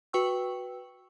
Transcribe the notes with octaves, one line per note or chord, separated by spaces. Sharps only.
F#4 B4 G5 C#6 E6